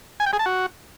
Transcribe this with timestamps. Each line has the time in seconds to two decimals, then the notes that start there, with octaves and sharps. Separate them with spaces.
0.20 G#5
0.26 G5
0.33 G#4
0.39 A5
0.46 F#4